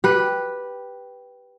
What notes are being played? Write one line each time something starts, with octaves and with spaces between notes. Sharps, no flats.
G4 B4